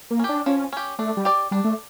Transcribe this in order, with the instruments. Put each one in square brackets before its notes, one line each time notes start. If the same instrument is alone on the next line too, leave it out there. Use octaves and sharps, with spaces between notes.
[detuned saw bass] A#3
[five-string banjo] C#4 G4
[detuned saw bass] D4
[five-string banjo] F3 [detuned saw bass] C#4
[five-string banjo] C#4 G4
[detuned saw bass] A3 [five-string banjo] D4
[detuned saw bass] G3
[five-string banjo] G4 D5
[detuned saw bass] G3 [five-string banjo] D4
[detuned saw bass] A3